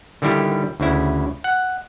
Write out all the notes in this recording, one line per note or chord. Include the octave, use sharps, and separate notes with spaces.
D3 D#3 G3 E4 G4
D2 C#3 E4
F#5